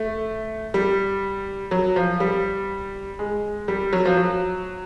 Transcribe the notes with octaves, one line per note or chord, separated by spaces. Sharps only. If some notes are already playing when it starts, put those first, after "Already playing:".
Already playing: A3
G3
F#3
F3
G3
G#3
G3
F#3
F3
F#3